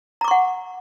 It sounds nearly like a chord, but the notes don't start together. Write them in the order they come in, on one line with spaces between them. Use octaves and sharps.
A#5 D6 C#6 F#5